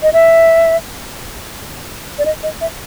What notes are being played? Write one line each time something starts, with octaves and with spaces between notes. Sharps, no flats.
D#5
E5
D5
D#5
D#5
E5